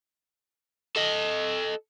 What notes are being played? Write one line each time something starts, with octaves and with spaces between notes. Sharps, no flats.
A4 D#5